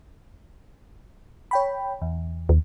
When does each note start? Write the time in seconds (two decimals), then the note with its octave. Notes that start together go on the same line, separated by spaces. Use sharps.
1.51 C#5 G5 B5
2.02 E2
2.49 D#2